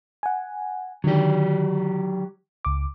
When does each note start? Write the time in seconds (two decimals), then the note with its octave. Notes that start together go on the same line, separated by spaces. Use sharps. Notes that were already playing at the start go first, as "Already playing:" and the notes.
0.23 F#5 G#5
1.04 D3 D#3 F#3 G4
2.65 C#2 D6